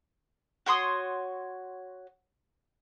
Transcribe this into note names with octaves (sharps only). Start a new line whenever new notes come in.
F#4 C#5 C6 D#6